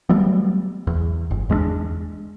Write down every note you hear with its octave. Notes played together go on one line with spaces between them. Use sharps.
F#3 G3 A3 B3
E2
G1
E2 G#3 A3 D4